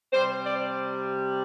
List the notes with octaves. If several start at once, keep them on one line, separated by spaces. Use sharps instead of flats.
C3 G3 C5
D5